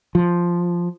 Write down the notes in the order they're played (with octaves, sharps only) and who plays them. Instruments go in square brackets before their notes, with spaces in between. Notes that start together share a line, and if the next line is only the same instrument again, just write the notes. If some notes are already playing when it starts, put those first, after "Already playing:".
[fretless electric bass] F3